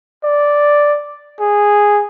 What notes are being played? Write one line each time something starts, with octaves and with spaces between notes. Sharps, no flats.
D5
G#4